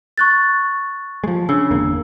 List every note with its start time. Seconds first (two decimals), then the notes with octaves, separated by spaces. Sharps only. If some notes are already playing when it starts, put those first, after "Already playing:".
0.18 C#6 F#6 A6
1.24 F3 G#3
1.49 C#3 D4 E6
1.71 G1 E2 A#3